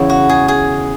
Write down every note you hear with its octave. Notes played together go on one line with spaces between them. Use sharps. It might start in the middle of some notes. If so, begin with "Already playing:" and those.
Already playing: E2 C#3 E3 B3 E4
F#4
G#4
G#4